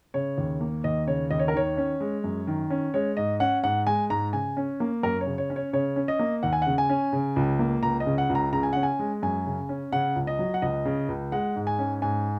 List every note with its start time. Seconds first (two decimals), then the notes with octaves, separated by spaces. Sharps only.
0.14 C#3 C#5
0.38 D#2
0.61 A#3
0.84 D#2 D#5
1.07 C#3 C#5
1.31 D#2 D#5
1.39 C#5
1.48 A#4
1.54 D#3 C#5
1.77 C#4
2.01 G#3
2.24 F#2
2.47 D#3
2.70 C#4
2.94 G#3 C#5
3.17 G#2 D#5
3.40 C#4 F#5
3.64 G#2 F#5
3.87 G#3 G#5
4.10 G#2 A#5
4.33 C#3 G#5
4.57 C#4
4.80 A#3
5.03 F#2 A#4
5.21 C#5
5.26 C#3
5.38 C#5
5.50 C#4
5.56 C#5
5.73 C#3 C#5
5.96 C#4
6.08 D#5
6.19 A#3
6.43 D#2 F#5
6.53 G#5
6.62 C#3 F#5
6.78 G#5
6.90 C#4
7.13 C#3
7.36 C#2
7.59 A#3
7.83 C#2 A#5
8.00 D#5
8.06 C#3
8.18 F#5
8.30 C#2
8.35 A#5
8.53 C#3 A#5
8.63 G#5
8.73 C#4 F#5
8.83 G#5
8.99 G#3
9.22 F#2 G#5
9.46 C#3
9.69 C#4
9.92 C#3 F#5
10.16 C#2
10.27 D#5
10.39 F#3
10.54 F#5
10.62 C#2 D#5
10.85 C#3
11.08 C#2
11.32 G#3 F#5
11.56 G#2
11.67 G#5
11.79 C#4
12.02 G#2 G#5